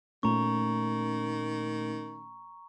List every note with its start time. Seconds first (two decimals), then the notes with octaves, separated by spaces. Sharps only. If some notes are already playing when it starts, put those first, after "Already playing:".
0.23 A#2 D#3 A3 C#4 A#5 C#6